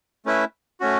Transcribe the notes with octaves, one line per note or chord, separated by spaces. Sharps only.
A3 C#4 E4 B4 E5
A3 C#4 F#4